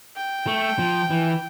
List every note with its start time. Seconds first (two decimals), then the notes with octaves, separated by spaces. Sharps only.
0.16 G5
0.47 A3
0.79 F3
1.10 E3